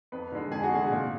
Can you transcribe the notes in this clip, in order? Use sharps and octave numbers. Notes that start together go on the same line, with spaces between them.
F2 B4
D3 G#3
F2 G#4
F#4
D3 G#3 G#4
A#2